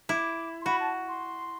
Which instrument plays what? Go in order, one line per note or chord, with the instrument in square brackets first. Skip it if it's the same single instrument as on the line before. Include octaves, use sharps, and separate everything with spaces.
[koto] E4 [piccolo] D6
[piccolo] C6
[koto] F#4 [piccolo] B5
[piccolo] A5
C6